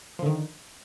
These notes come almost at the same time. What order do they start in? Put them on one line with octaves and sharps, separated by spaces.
F3 D3 D#3